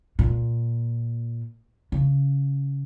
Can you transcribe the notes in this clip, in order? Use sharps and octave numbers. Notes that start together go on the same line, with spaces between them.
A#2
C#3